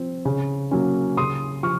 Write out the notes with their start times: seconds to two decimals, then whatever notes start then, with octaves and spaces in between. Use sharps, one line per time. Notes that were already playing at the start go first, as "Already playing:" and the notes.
Already playing: F3 C4
0.25 C#3
0.71 F#3 A#3 C#4
1.17 C#3 C6 D#6
1.63 F3 C#6 F6